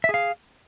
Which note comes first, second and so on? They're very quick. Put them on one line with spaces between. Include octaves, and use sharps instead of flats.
E5 G#4 F5